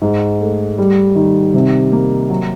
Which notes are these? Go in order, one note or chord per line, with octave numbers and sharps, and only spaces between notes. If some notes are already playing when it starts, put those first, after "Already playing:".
G#2
A3
G3
D#3
C3
A#3
F#3